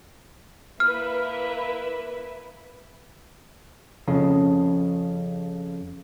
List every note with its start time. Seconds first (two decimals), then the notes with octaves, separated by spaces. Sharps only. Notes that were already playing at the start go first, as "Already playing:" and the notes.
0.80 A#3 E4 B4 E5 F6
4.08 F2 C#3